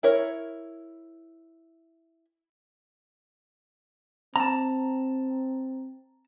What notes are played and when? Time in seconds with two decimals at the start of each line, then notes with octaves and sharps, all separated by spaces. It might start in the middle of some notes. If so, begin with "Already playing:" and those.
0.03 E4 A#4 C#5
4.36 C4 A5 A#5